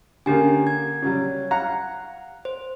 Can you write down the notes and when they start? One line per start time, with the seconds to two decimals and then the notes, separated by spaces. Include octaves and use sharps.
0.26 D3 A#3 C#4 G4 G#5
0.67 G#6
1.02 C#3 F#3 G3
1.51 F5 F#5 A#5
2.45 C5